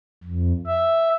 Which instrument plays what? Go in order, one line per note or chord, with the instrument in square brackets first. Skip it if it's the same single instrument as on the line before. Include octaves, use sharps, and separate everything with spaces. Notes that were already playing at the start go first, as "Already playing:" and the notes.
[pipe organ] F2
E5